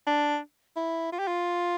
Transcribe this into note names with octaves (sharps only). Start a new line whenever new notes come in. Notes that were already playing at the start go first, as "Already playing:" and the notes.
D4
E4
F4
G4
F4